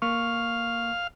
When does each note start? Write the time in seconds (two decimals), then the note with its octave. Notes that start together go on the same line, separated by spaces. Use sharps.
0.02 A#3 F5 C#6